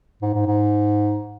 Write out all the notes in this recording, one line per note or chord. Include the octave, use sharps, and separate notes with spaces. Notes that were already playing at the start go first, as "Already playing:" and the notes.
G#2
G#2
G#2